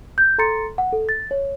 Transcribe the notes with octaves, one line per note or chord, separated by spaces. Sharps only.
G6
A4 A#5 C6 A6 C#7
F#5
A4
A6
C#5